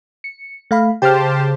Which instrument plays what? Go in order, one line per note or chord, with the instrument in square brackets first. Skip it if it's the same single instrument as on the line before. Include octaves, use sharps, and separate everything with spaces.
[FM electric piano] C#7
A3 F5 B5
[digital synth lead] C#3 [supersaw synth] G4 C5 A5 [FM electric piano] G5 F6